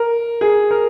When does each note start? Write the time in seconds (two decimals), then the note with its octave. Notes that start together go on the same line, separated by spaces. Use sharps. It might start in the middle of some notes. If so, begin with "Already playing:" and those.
Already playing: A#4
0.41 G#4
0.71 A#4